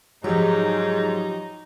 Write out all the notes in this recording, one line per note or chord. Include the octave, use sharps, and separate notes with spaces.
G#2 F3 F#3 D#4 G4